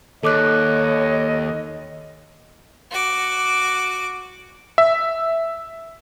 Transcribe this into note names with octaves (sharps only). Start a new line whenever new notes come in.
D#2 A4 C#5 D#5 D6 F#6
F#4 D6
E5